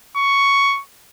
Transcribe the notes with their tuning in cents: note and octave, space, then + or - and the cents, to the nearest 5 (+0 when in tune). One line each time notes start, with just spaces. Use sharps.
C#6 +5